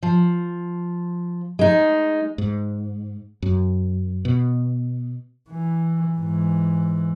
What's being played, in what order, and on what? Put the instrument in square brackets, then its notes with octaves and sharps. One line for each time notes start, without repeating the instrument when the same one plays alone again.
[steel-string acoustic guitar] F3
G#3 D#4
[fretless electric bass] G#2
F#2
B2
[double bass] E3
G#2 E3